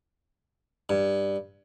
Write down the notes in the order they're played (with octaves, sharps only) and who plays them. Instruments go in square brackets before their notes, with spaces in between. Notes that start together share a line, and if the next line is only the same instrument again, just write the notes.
[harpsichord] G2